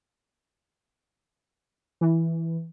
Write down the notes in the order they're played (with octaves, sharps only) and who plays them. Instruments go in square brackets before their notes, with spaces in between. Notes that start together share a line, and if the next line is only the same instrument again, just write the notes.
[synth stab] E3